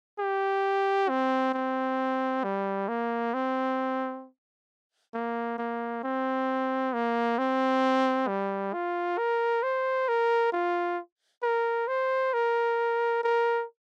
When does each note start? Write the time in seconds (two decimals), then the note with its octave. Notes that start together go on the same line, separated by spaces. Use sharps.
0.19 G4
1.09 C4
1.54 C4
2.44 G3
2.89 A#3
3.34 C4
5.14 A#3
5.58 A#3
6.03 C4
6.94 A#3
7.38 C4
8.28 G3
8.73 F4
9.18 A#4
9.63 C5
10.08 A#4
10.53 F4
11.43 A#4
11.88 C5
12.33 A#4
13.24 A#4